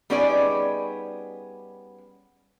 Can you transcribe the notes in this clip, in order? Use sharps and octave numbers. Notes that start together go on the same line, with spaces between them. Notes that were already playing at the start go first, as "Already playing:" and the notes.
G3 B3 C#4 D#4 G#4 D5